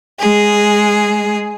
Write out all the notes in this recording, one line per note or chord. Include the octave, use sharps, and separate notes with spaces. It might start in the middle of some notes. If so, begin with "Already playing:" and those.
G#3 G#4